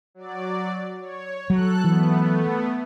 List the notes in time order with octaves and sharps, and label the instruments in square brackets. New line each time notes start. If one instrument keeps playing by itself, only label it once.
[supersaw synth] F#3 D5
C#5
[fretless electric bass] F#3 [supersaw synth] A4 F#6
[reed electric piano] E3 [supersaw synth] A3 B3